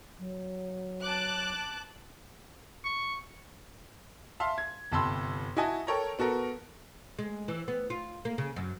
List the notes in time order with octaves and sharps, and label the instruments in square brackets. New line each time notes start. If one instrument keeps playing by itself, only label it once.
[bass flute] F#3
[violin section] A5 D6 F#6
[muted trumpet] C#6
[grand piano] E5 F5 A5 C6
G#6
G1 C3 A5 B5 C6 E6
E4 F#4 D#5 G#5 A5
A4 A#4 C#5 G5 A#5
B3 F#4 A4 A#4
[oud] G#3
E3
B3
F4
A#3
C#3
F#2